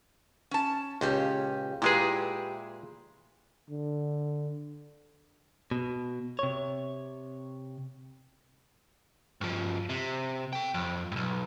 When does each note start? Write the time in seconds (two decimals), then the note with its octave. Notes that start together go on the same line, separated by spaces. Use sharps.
0.51 C#4 A5
1.01 C#2 A#2 C#4 G4
1.82 A#2 G#3 E4 G4 G#4 B4
3.70 D3
5.71 B2
6.39 C3 C#5
9.41 G2 F3
9.89 C3
10.53 A4 G5
10.74 F2
11.12 B1 G2